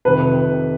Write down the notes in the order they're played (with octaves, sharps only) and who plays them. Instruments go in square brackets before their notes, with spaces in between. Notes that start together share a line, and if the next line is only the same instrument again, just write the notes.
[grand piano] F2 C3 D#3 B4